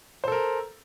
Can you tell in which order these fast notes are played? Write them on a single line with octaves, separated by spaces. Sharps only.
C5 A4 A#4